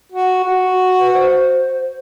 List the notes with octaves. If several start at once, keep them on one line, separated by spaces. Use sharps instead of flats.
F#4
F#4
B4
C5